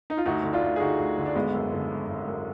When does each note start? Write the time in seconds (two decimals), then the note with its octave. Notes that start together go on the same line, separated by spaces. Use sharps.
0.10 D#4
0.17 F4
0.26 D2 D#4 F#4
0.43 D3
0.53 D4 F4
0.62 D2
0.76 G#4
0.80 D3 D#4 F#4
0.98 D2
1.18 D3
1.26 D4
1.35 G#1 G#3 B3
1.54 F#2
1.72 D3
1.90 G#1
2.08 G#1
2.28 F#2